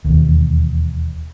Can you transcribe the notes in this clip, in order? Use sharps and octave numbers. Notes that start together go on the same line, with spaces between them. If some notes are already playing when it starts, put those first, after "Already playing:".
E1 D#2